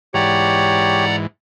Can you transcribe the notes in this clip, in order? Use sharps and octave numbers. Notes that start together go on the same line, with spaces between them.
G#2 E3 G4 C#5 D5 F#5 A#5